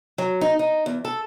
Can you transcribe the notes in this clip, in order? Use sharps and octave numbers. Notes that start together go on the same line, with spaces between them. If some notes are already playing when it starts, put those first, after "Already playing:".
F#3
D#4
D#4
E2
A4